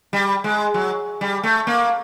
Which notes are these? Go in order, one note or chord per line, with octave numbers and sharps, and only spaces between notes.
G3
G#3
F#3
G3
A3
A#3